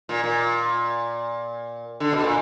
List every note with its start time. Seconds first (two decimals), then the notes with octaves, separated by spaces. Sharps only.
0.09 A#2
0.24 A#2
2.00 D3
2.13 B2
2.24 A#2